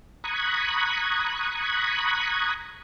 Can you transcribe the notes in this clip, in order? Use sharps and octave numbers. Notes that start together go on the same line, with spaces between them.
A#5 B5 C#6 D#6 F#6 G#6